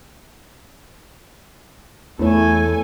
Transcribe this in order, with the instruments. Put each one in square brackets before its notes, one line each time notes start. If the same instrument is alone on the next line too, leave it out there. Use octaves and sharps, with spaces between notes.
[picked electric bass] E2 [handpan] E3 E4 C#5 [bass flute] A3 [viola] A4 G#5